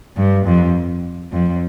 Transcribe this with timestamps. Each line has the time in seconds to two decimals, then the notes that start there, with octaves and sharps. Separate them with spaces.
0.16 G2
0.45 F2
1.33 F2